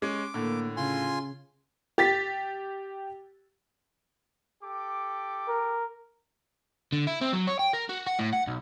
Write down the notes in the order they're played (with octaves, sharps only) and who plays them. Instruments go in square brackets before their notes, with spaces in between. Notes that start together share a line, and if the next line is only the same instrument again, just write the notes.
[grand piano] G#3 C#4 [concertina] D6
[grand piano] A2 D3 [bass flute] A#3
[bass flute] C#3 [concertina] F4 G#5 C6
[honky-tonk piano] G4 A6 B6
[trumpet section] G4 A4 D6
[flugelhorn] A#4
[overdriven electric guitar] D3
E4
C4
F#3
C#5
G5
A#4
F#4
F#5
A2
F#5
B1